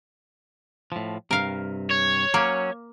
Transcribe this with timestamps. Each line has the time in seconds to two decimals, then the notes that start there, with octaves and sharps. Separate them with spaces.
0.92 A2 F3
1.31 G2 C3 A#4 F5
1.91 C#5
2.34 F#3 A#3 C#4